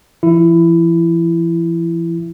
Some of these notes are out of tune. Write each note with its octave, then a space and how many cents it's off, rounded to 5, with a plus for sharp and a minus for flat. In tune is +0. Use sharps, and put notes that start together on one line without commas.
E3 +45 E4 +15